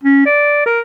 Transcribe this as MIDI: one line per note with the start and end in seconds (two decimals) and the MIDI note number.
0.03 0.23 61
0.26 0.65 74
0.66 0.80 70